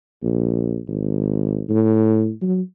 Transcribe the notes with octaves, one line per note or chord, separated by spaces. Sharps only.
A#1
G#1
A2
F#3